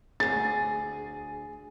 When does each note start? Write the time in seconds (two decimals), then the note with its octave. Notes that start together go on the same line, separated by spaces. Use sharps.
0.20 D2 G#4 A6